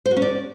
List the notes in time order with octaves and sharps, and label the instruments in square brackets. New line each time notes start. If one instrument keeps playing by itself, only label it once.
[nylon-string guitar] C5
F#4
C#4
D5